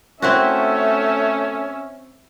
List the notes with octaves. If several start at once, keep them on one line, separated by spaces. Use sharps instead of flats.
A3 C4 C#4 E4 F#4 E5